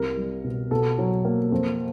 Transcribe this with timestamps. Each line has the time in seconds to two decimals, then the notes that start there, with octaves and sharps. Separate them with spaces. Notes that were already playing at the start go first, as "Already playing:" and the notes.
Already playing: C2 A#4
0.17 G3
0.44 B2
0.71 B2 A4
0.98 F#3
1.25 A#3
1.52 F2